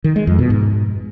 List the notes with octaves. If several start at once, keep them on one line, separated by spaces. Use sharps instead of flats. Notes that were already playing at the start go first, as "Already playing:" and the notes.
D#3
G#3
F2
B2
G#2